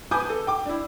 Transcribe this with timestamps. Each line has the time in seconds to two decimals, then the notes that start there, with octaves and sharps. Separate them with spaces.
0.11 B4 G#5 A5 D6 D#6 G6
0.30 A4
0.47 G5 D6
0.65 D4 E4